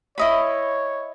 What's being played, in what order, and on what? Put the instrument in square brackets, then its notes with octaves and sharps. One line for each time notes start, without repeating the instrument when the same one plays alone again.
[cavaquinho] E4 D#5 B5 [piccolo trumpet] C#5